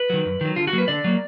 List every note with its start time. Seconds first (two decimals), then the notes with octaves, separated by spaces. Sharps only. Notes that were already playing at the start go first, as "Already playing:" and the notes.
Already playing: B4
0.10 D#3 F#3
0.25 F#2
0.41 D#3 F#3
0.56 D3 F4
0.67 F#4
0.73 F#3 A#3
0.78 B4
0.88 D3 D5
1.04 F#3 A#3